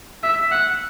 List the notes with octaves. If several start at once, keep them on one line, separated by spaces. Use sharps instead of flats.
E5
F#5